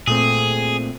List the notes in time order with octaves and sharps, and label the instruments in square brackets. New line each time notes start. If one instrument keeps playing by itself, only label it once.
[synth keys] A#2 A3 C4 [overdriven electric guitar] G#4